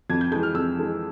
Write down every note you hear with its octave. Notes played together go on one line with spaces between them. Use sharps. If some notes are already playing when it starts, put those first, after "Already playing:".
F2 G#6
G6
E3 G#3 G6
F6
F2 E6
E3 G#3